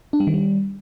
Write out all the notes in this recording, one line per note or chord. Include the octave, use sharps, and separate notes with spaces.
D4
G3
D#3
G3